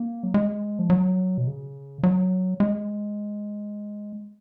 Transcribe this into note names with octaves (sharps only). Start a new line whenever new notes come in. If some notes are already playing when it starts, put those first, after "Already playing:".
Already playing: A#3
F#3
G#3
F3
F#3
B2
C#3
F#3
G#3